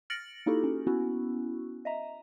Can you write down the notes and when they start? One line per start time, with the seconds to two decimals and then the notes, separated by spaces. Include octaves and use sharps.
0.10 F6 A6 A#6 C#7 D7 F#7
0.46 A#3 D#4 E4 F#4 G4 A4
0.64 C#4
0.87 B3 C#4 E4 F#4
1.85 D#5 E5 A#5